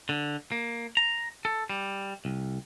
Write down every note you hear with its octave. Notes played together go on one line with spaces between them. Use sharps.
D3
A#3
A#5
A4
G3
C2